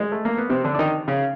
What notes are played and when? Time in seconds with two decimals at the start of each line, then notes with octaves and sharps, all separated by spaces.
0.00 G#3
0.12 A3
0.25 A#3
0.38 B3
0.50 C3 C4
0.64 D3 D4
0.74 D4
0.79 D#3 D#4
1.08 C#3 C#4